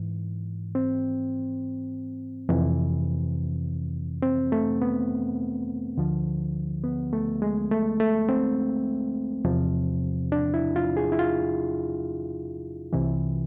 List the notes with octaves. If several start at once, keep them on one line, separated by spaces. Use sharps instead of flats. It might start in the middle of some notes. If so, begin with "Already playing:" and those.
Already playing: G#2 E3
C4
F2 C3 E3
C4
A3
B3
D2 D3 F3
B3
A3
G#3
A3
A3
C4
E2 C3 F3
D4
E4
F4
G#4
E4
F4
C2 C3 E3